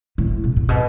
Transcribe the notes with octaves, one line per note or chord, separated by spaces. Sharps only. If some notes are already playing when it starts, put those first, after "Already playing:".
A2
B2
A#2
B2